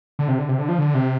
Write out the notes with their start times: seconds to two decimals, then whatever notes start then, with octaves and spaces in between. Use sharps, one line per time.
0.19 D3
0.28 C3
0.38 D3
0.49 C3
0.59 D3
0.69 F3
0.78 D3
0.94 C3